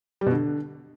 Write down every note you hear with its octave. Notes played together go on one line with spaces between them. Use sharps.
G3
B2
D3